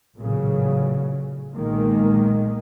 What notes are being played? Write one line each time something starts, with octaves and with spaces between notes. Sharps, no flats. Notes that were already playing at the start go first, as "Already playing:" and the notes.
A1 A#2 C#3 F#3
B1 A#2 D#3 G#3 A#3